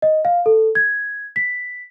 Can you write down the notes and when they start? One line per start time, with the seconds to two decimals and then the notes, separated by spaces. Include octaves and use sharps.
0.02 D#5
0.25 F5
0.46 A4
0.75 G#6
1.36 B6